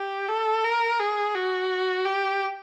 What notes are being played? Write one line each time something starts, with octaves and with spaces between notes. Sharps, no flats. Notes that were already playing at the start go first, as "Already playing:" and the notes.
Already playing: G4
A4
A#4
G#4
F#4
G4